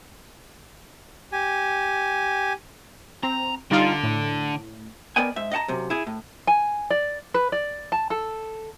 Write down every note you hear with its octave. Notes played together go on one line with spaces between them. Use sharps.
G4 G#5
C4 A#5
D3 G3 D#4 F4
A2
B3 A#4 D5 D#5 G5 G#5
G#2 E5
D#5 F5 F#5 A5 A#5
F#2 C3
E4 G#4
A2
G#5
D5
B4
D5
A5
A4